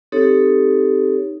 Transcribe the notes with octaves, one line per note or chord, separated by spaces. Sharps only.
C4 D#4 G4 A4 C#5